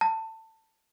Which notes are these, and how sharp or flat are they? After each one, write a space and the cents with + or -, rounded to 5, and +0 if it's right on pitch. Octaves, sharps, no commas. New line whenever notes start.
A5 +20